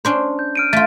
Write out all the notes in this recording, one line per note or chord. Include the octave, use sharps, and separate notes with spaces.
C#4 D4 C5
G6
F6 D7 D#7
A3 F4 A6